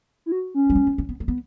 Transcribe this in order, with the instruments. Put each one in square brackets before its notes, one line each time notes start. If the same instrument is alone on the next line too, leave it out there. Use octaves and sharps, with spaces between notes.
[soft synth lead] E4
F#4
C#4
[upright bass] G3
A3
B3
C#4
B3
A3
B3